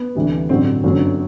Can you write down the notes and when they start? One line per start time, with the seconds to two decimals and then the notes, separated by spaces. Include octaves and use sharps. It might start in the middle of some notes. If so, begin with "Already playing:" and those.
Already playing: B3
0.15 D2 C3 E3 G3
0.49 A1 G2 D3 F#3 C4
0.83 G1 F#2 D3 F#3